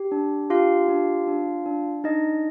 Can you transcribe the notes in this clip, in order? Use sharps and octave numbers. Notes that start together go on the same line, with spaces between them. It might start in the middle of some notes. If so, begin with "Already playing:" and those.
Already playing: G4
D4
F4 G4 F5
D4
D4
D4
D4 D#4 D#5